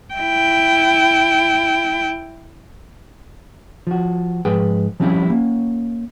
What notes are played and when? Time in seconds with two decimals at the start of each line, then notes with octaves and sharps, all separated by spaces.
0.14 E4 G5
3.87 F3 F#4
4.45 G#2 F3 G#4 B4 G5
5.00 F3 G3 C4 C#4 E4
5.29 A#3 C#4